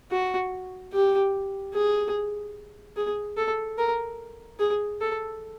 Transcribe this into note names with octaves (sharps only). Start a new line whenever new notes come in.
F#4
G4
G#4
G#4
A4
A#4
G#4
A4